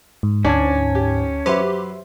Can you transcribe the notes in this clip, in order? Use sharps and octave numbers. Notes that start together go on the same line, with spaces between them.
G#2
D2 G#2 C#4 D4 A5 G#6
G4
F#2 G4 B4 C5 E5 C6